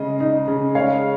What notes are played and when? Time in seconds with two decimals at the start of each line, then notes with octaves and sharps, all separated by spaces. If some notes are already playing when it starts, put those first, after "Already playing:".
Already playing: C#3 G#3 D#5
0.20 D#4
0.48 C#3
0.75 G#3 C#5 F5